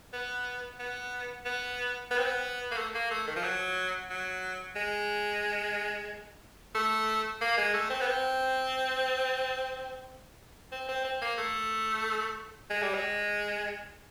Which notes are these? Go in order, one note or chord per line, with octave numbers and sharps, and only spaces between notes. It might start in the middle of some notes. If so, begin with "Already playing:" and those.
B3
B3
B3
B3
C4
B3
A#3
A3
A#3
A3
D#3
F3
F#3
F#3
G#3
A3
A#3
G#3
A3
C4
B3
C4
C4
C4
C4
A#3
A3
G#3
G3
G#3